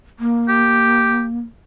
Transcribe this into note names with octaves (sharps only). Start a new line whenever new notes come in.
A#3
G4